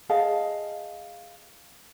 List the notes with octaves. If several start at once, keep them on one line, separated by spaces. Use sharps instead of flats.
G#4 D#5 F5 A5